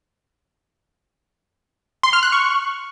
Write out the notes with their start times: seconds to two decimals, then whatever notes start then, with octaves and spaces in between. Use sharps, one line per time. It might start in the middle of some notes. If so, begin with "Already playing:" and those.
2.03 C6
2.13 F6
2.23 F#6
2.32 C#6